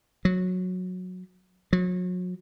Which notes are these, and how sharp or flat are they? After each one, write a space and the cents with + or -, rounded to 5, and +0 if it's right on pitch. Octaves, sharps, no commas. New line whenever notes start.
F#3 -15
F#3 -35